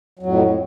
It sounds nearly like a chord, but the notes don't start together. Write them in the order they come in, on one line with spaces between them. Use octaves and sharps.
F#3 F2 A2